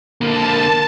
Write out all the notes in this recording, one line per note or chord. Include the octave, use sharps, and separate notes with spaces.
D3 A#3 A5